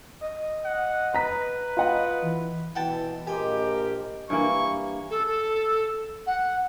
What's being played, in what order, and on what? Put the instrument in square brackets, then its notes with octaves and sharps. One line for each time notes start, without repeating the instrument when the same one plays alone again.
[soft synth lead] D#5
[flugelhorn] F#5
[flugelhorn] B4 [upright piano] A#5 B6
[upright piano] F4 F#5 [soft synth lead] D#5
[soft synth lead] E3
[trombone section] B2 E3 E4 [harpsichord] F#5 G5 A5
[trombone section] A#1 A#4 [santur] G#3 A#3 [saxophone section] G4 [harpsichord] G#5
[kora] G2 E3 A#3 [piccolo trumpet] C#6
[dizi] A4
A4
F#5